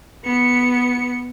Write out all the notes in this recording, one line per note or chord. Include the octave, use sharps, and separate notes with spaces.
B3 C#7